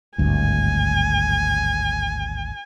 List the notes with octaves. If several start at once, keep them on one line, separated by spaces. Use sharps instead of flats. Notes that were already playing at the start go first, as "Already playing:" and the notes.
G#1 D2 G2 G#5